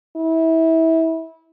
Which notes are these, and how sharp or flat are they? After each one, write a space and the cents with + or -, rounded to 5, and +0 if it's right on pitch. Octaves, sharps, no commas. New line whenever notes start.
E4 -25